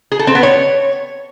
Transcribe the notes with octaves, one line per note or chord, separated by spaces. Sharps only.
G#4
A4
C4
B3
C#5